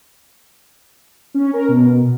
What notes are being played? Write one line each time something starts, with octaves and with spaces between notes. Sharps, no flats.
C#4
A#4
B2